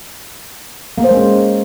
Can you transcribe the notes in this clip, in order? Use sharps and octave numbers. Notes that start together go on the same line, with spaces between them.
A#3
C5
G#3
C#4